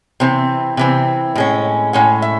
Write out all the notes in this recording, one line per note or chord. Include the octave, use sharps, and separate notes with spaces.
C3 E3 C4
C3 E3 C4
A2 G#3 C#4
A2 G#3 C#4 F#5
E5